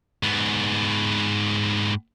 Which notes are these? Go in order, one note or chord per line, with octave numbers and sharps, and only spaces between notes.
G#2 B3